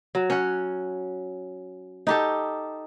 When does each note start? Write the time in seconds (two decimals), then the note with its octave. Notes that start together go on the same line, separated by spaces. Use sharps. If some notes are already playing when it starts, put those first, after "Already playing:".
0.15 F#3
0.30 C#4 F#5
2.07 D#4 G4 A4